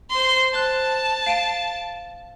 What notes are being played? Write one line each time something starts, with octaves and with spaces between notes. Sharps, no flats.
C5 C6
C5 A5 F#6
F5 D7 D#7